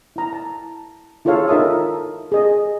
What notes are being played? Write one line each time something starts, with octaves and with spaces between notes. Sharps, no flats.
E4 A#5
A5
E4 F4 G#4 A4 C#5 F5
D#4 A#4 E5 A5 D#6
G#4 D#5